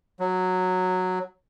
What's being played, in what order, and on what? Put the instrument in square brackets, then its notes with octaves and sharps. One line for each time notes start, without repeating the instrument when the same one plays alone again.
[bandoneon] F#3